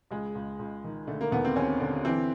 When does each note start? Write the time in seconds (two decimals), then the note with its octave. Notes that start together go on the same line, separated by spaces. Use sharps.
0.11 C#2 G#3
0.35 C#2
0.59 C#2
0.84 D#3
1.07 D3 A3
1.21 A#3
1.32 D#2 B3
1.45 C4
1.56 D#2 C#4
1.80 D3
2.05 E3 C4